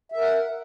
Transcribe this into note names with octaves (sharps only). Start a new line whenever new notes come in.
A#4 E5 F#5